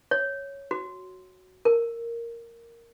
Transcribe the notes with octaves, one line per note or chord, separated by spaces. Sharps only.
C#5
F#4
A#4